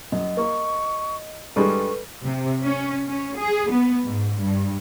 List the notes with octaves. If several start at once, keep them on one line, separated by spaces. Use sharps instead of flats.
F#2 D#5
A#3 C#6
G2 G3 G#3 A4 B4 C#6
C3
C#4
C#4
G#4
B3
G#2
G2